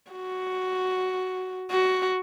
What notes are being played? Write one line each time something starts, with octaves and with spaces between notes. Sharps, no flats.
F#4
F#4